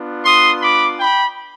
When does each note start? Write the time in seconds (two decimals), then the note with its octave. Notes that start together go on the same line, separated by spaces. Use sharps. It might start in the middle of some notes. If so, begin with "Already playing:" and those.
Already playing: B3 D4 F4
0.25 C6 D#6
0.61 B5 D6
0.99 G5 B5